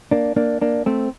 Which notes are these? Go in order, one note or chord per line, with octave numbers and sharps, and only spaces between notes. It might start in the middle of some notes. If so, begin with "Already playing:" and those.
A#3 D4
A#3 D4
A#3 D4
A3 C4